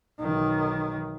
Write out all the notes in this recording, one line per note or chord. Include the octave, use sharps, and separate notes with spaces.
B1 D#3